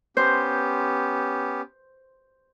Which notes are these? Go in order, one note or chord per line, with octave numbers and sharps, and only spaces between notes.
B3 C#4 G4 C5